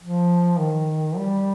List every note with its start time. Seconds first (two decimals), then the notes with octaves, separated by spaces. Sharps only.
0.02 F3
0.59 D#3
1.17 G3